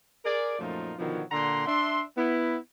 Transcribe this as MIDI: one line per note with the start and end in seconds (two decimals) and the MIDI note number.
0.25 0.56 68
0.25 0.56 70
0.25 0.56 74
0.59 0.94 42
0.59 0.94 46
0.59 0.94 53
0.59 0.94 57
0.59 0.94 63
0.59 0.94 65
0.99 1.22 47
0.99 1.22 50
0.99 1.22 51
0.99 1.22 53
0.99 1.22 54
1.31 1.67 46
1.31 1.67 50
1.31 1.67 78
1.31 1.67 82
1.31 1.67 84
1.67 2.03 62
1.67 2.03 76
1.67 2.03 84
2.17 2.56 59
2.17 2.56 64